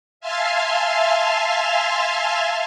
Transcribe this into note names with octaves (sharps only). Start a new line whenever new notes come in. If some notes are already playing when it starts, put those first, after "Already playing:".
E5 F5 G#5 A5 C6 F6